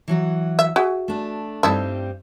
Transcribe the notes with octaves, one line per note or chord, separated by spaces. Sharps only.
E3 F#3 F#4
E5
F#4 G#4 E5
A3 D4
G2 G3 C4 D#4 E4 A4